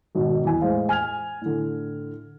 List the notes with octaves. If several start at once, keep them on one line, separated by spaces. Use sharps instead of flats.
G#1 B2 D#5
E2 G#5
A2 E3 G#3 C5 F5
G#5 F6 G#6 F7
A2 D3